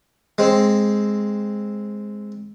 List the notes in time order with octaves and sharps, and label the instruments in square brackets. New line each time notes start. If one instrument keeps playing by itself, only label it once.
[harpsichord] G#3 C4